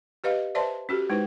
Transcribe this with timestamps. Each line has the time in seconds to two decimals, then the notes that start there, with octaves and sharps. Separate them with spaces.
0.24 G4 B4 D#5 F5
0.55 B4 C5 D5 E5 A5 C6
0.89 C#4 F#4 G4 A4
1.10 G#3 D#4 E4 B4 C5